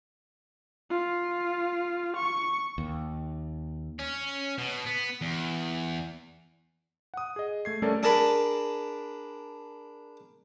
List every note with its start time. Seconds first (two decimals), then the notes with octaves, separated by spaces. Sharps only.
0.90 F4
2.17 C#6
2.78 D#2
3.99 C#4
4.58 B2
4.86 B3
5.21 E2
7.14 F#5 D#6
7.36 G#4 D#5
7.65 A3 G#6 C7
7.82 G3 A3 C#4 A4 A#4 D5
8.03 D4 G#4 A#4 A5 B5